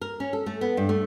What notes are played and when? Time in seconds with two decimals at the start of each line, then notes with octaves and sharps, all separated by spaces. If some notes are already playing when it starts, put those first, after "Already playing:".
0.01 A#4
0.20 C#4
0.33 A4
0.46 A3
0.61 B3
0.77 G2
0.89 A3